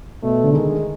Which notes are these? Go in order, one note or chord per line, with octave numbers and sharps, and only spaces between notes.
B2 A3
D3
D#3 G#3